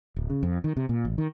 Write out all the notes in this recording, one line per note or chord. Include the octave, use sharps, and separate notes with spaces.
D1
C#3
F2
D#3
C3
A#2
A1
D#3